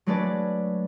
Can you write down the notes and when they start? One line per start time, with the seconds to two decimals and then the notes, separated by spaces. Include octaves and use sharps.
0.06 F#3 G#3 A3 D4 B4 D5